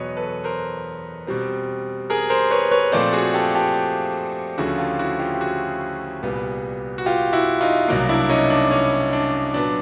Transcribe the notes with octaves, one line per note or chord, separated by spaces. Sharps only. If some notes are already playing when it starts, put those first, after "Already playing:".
Already playing: E2 B2 F#3 B3 B4 C#5 D#5
A4 B4
A#4 C5
B2 G3 C4
G#4 A#4
A#4 C5
B4 C#5
B4 C#5
A#2 F3 A3 C4 C5 D5
F#4 G#4
G4 A4
G4 A4
D2 C#3 F3 A3 F#4 G#4
F4 G4
E4 F#4
F4 G4
G4
F#4 G#4
C2 A#2 G3 B3
F#4
F4 G4
E4 F#4
D#4 F4
C2 B2 F#3 A#3
D4 E4
C#4 D#4
D4
C#4
D4
A#2 F#3 B3 D4